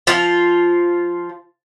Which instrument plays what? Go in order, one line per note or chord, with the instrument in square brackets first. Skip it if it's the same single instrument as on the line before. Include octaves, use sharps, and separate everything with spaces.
[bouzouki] F3 F4